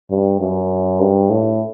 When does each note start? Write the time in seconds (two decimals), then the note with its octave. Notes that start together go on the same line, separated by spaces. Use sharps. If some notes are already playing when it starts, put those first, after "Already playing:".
0.11 G2
0.40 F#2
1.00 G2
1.30 A2